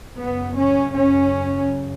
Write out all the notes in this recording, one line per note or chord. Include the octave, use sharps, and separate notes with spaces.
F#2 C#3 B3
C#4
C#4